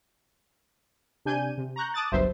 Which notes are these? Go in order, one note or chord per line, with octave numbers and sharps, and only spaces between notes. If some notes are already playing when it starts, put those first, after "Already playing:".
C3 D4 G#5 G6 D#7
C3
A#5 C#6 F#6 G6
A5 D6 D#6 F#6 A6
G1 C#2 G2 F#3 C5 E5